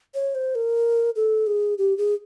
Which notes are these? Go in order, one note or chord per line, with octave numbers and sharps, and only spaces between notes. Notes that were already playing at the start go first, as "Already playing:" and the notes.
C#5
C5
A#4
A4
G#4
G4
G#4